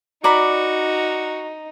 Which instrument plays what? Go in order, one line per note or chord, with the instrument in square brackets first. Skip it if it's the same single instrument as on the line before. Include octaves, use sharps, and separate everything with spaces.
[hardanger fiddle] D#4 [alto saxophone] F#4 [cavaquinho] D5 A#5 B5